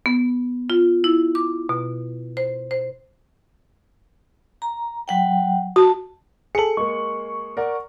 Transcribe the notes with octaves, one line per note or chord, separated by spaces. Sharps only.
B3
F4
E4
D6
B2
C5
C5
A#5
F#3 F#5 G5
F#4 A5
G#4 A4 C#7 F#7
G#3 A#3 C#6
A#4 D5 F#5